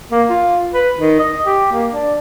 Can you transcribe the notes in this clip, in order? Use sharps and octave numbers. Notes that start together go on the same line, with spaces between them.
A#3
F4
B4
D#3
D#5
G4
A#3
D4